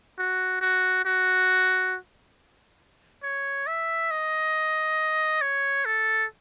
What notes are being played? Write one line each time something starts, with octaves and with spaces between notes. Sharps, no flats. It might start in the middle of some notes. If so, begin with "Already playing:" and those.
F#4
F#4
F#4
C#5
E5
D#5
C#5
A4